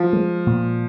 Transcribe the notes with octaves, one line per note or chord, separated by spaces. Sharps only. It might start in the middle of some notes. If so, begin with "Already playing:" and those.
Already playing: F3
G#3
A#2